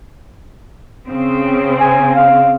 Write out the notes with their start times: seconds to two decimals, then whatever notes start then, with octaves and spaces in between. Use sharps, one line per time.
1.08 C#3 C4
1.80 G#5
2.15 F5